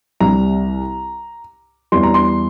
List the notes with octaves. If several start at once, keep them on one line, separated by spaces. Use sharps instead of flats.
C2 C3 G3 A#5
E2 E3 G3 C6
A#5
C6